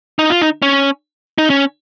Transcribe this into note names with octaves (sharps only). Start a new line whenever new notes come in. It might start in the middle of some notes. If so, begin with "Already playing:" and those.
D#4
F4
D#4
C#4
D#4
C#4